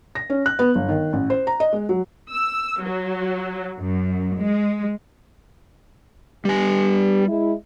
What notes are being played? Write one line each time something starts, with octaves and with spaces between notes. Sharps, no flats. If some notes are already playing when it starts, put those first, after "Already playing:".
A#6
C#4
F#6
B3
G1
D#3
A1
C5
A#5
D#5
G#3
F#3
E6
F#3
F#2
G#3
G3 B3 D4 G4 G#5
G#3 E4